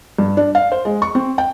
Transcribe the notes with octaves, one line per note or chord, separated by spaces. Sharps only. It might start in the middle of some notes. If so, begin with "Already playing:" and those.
G2
D4
F5
C5
G#3
C#6
C4
G5